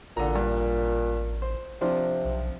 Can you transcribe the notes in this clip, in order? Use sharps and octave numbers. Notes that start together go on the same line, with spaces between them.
A1 A#2 D3 A#5
G2
C5
C3 F3 C4 D4
B1